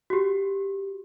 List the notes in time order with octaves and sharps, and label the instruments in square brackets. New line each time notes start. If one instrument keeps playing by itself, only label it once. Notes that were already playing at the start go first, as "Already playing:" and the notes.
[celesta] F#4 G4